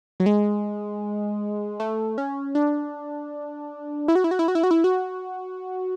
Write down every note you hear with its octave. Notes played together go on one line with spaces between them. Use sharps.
F#3
G#3
A3
C#4
D4
E4
F#4
E4
F#4
E4
F#4
E4
F#4
E4
F#4